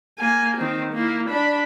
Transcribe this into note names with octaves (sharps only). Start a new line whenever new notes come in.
A#3 G#5
D#3 C4
A#3 E4
D4 B5